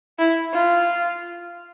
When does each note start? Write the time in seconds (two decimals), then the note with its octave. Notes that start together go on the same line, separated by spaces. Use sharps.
0.19 E4
0.53 F4